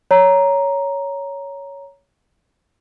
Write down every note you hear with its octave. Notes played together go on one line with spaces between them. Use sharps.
C#5 A#5